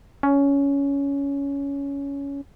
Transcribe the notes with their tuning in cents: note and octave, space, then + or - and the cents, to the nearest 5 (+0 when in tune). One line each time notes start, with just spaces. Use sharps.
C#4 +15